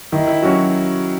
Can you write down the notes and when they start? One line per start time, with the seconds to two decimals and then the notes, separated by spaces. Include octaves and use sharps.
0.12 D#3 E4
0.28 E4
0.42 F#3 C#4 F#4